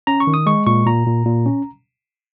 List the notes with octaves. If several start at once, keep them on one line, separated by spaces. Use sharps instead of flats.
C#4 A#5
C#6
D#3
D#6
G#3 C#6
A#2 C#6
A#2 A#5
A#2
A#2
C#4